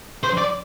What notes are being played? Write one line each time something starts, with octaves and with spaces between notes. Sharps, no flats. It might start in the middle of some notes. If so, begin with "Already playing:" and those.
C5
D5